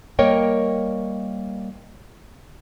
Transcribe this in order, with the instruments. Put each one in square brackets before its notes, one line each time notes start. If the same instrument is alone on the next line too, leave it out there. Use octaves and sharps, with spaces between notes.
[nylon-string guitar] G3 A#3 A#4 C#5 D#5 G5